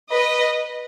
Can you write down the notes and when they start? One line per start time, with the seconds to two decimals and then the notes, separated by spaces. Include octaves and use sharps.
0.11 B4 D#5